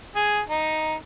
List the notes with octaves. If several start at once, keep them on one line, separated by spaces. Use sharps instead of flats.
G#4
D#4